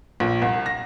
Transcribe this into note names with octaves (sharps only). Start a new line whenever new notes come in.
A#1
C2
A#6